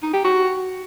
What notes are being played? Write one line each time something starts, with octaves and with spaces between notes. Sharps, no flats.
D#4
G4
F#4